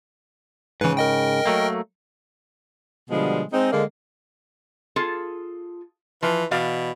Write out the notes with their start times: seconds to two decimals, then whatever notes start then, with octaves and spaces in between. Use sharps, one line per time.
0.81 G#2 C#3 E3 B4
0.97 A#4 D#5 G5
1.46 F#3 A3 A#3
3.10 B2 D3 F3 G3 G#3 B3
3.53 G#3 C4 D#4
3.72 D3 G#3 A#3
4.96 F4 G#4 A4
6.23 E3 F3
6.51 B2 E3 D5 F5